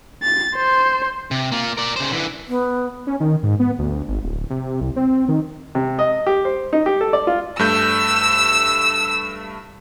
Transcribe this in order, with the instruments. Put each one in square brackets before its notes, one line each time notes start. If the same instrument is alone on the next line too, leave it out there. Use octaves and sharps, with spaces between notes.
[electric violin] A6
C5
[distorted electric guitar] C3
A#3 F4
A#4 D5
C#3 C5
D3 E3
[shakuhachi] B3
[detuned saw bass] C#4
D#3
G#2
B3
D2
G#1
D1
C3
C2
C4
D#3
[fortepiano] C3
D#5
G4
C5
D#4
G4
A4
D5
F4
[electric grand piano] G2 A3 G6 [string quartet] E6